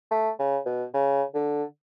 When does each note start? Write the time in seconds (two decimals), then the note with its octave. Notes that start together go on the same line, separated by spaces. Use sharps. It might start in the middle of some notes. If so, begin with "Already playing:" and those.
0.11 A3
0.39 C#3
0.66 B2
0.94 C#3
1.35 D3